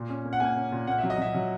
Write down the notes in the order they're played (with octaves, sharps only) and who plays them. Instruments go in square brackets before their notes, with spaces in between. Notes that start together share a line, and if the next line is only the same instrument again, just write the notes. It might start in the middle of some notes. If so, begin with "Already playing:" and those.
Already playing: [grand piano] A#2
C#4
A#3
F#5
A#3 G#5
C#4
A#2
A#3 F#5
E5
F#3
D#5
F#3 E5
F#3